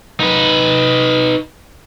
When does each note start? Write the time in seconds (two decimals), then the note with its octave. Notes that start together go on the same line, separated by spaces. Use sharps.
0.20 D#4 B4